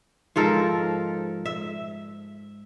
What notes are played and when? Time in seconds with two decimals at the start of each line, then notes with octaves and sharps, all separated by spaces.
0.36 G#2 F3 A4 A#4
1.46 E5